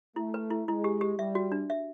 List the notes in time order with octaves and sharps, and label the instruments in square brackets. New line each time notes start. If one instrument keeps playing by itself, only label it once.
[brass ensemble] A3 [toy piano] E4
[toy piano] B4
E4
[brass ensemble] G#3 [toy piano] E4
[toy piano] G4
G4
[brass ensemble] G3 [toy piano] E5
[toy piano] F#4
D4
E5